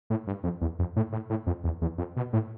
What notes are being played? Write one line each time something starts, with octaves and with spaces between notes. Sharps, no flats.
A2
G2
F2
E2
F2
A2
A2
A2
F2
E2
E2
F2
B2
A2